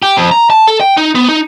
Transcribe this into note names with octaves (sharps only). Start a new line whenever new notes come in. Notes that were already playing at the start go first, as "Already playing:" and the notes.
G4
F2
A#5
A5
A4
G5
D#4
B3
D#4